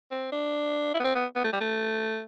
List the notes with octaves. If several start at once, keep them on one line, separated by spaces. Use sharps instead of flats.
C4
D4
E4
B3
C4
B3
B3
A3
G3
A3